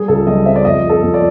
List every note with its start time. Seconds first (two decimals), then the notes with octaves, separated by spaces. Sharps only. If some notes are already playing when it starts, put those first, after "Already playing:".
Already playing: G3 G#4
0.08 C#2 A4
0.27 G3 D#5
0.45 C4 E5
0.55 D5
0.65 F2 D#5
0.83 F2
0.90 A4
1.02 F2
1.14 D5